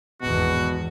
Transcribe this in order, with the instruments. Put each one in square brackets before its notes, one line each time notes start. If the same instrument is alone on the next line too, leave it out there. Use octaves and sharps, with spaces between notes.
[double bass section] G#1 E2 [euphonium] B2 [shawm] F#4